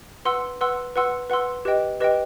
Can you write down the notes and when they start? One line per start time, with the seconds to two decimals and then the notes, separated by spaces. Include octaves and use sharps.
0.25 B4 F#5 C6 E6
0.61 B4 F#5 C6 E6
0.96 B4 F#5 C6 E6
1.30 B4 F#5 C6 E6
1.65 G4 B4 D#5 G5
2.00 G4 B4 D#5 G5